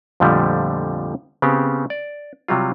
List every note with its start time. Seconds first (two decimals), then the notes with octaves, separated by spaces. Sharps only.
0.20 F2 A#2 D3 F3 G3 A3
1.42 C#3 B3 C4 G4
1.90 D5
2.48 C3 F#3 G3 F4